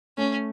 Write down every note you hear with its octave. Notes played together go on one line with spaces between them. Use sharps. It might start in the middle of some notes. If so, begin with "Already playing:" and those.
A3 C#4